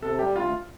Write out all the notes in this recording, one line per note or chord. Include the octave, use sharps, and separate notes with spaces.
C3 A4
G3 G4
D2 F4